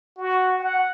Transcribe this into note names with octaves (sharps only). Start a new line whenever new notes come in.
F#4
F#5